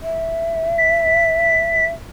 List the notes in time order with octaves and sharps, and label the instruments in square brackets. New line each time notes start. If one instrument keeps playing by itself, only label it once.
[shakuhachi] E5
[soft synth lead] B6